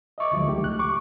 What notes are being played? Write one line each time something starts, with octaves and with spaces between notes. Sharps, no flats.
D#5 E5 C#6 D6
D2 D3 F3 F#3 G#3
A3 D#4 G4
C#2 F#6
C#6 D6